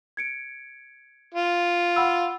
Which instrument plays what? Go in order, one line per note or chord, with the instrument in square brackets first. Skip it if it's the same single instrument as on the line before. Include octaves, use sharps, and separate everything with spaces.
[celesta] G#6 C#7 D7
[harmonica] F4
[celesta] F#5 B5 E6